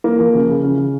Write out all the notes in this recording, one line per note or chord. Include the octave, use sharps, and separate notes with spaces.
A#3
F3
C#3
C#3
C#3
C#3